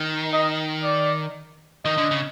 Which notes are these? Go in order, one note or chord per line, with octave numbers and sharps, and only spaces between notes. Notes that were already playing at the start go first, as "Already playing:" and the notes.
Already playing: D#3
D#5
D5
D#3 D#5
D3
C#3